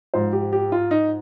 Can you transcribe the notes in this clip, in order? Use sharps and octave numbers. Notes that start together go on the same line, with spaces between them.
G#2 F3 C5
G4
G4
F4
D#4